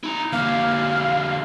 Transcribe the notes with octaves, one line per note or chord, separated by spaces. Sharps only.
E4 A#5
D3 A#3 F5